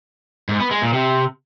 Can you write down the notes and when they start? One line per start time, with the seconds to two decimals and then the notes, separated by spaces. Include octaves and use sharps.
0.49 G#2
0.60 B3
0.71 G#3
0.82 A#2
0.93 C3